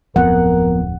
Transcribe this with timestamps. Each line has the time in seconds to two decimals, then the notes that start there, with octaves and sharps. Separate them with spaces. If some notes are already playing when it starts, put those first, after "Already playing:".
0.16 D1 F2 F3 B3 A#4 F#5